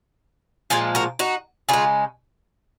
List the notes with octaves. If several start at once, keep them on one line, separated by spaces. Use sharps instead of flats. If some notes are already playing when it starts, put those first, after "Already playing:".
A#2 F3 G#3 F4 G#4
F#4 A#4
D#4 F#4
C#3 G#3 F4 G#4